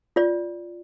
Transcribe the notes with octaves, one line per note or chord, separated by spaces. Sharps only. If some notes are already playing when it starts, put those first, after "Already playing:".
F4 D5